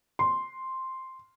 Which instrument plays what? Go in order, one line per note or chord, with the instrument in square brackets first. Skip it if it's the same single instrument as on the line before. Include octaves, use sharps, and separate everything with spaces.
[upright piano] C6